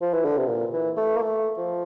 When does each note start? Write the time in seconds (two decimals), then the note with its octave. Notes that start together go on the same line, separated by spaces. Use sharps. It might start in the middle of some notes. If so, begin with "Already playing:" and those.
0.02 F3
0.13 E3
0.25 D3
0.37 C3
0.48 A#2
0.73 E3
0.97 A3
1.16 A#3
1.22 A3
1.57 F3